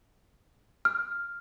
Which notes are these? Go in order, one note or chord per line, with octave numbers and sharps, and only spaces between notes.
F6